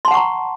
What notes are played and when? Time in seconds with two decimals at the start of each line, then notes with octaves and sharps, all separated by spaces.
0.05 C6
0.08 A5
0.11 F#5
0.14 C#6
0.17 A#5